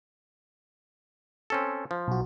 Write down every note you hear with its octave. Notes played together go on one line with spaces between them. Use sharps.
C4 C#4 A4
F3
B1 F#4